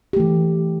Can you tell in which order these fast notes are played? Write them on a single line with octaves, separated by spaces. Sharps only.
G4 A3 E3